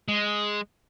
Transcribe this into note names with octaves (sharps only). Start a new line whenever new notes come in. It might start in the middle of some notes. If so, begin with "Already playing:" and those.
G#3